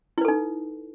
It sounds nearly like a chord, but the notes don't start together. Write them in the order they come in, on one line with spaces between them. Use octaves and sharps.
E4 B4 A4 D#4